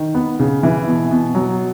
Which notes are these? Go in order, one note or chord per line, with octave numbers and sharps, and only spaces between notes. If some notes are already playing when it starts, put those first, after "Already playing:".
Already playing: D#3
B3
C#3
E3
B2
B2
F#3